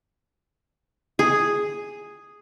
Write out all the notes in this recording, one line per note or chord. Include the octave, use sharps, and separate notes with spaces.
G#4